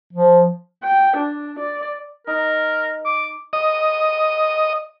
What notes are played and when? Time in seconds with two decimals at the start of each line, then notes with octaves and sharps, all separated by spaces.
0.13 F3
0.83 G5
1.17 D4
1.59 D5
2.27 D#4 A#4
3.05 D6
3.53 D#5